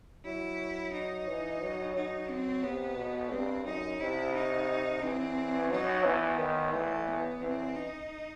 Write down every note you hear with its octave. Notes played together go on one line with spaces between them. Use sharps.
F#3 E4
D#4
E3
F#3
F#3 D#4
C4
C3 B3
B2
G2 C4
F#2 D#4
C3 E4
D#4
E3 C4
F#3 D#4
E3 B3
D#3
E3 A3
B3
E3 C4
D#4